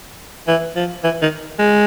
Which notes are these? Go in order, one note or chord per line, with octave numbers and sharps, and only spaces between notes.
E3
F3
E3
D#3
G#3